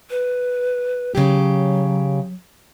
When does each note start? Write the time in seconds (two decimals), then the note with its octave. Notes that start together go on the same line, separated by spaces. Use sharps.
0.10 B4
1.15 C#3 F#3 G4